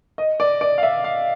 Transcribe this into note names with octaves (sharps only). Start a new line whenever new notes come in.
D#5
D5
D5
F5
E5
F5